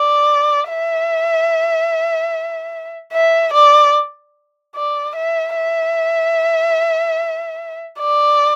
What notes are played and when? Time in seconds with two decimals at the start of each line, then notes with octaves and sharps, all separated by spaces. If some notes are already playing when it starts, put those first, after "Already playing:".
Already playing: D5
0.69 E5
3.13 E5
3.53 D5
4.75 D5
5.16 E5
5.56 E5
8.00 D5